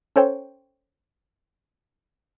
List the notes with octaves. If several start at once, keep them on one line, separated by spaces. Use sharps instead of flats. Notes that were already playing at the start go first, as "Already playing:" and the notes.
C#4 A4 C5 C#5 G5